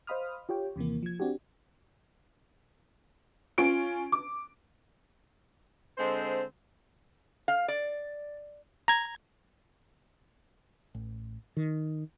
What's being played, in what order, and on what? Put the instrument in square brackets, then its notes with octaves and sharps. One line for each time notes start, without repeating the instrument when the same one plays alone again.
[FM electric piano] C5 D#5 F5 B5 D#6 F6
F4 G4 C#5 G5
D#2 C3 E3 A#3
F3 G#6
C4 D4 F#4 G4
[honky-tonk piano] C#4 F4 D7
D6
[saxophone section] D3 G#3 C4 C5
[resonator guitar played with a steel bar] F5
D5
[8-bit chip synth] A#5 G#6
[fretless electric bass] A1
D#3